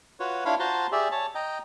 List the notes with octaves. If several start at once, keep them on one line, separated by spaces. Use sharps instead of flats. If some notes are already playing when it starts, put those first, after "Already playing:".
F4 F#4 B4 C#5
D4 E4 F4 C#5 F5 B5
F4 F#4 C5 A5 A#5 C6
G4 G#4 D5 E5
C#5 A5
D#5 G5 A#5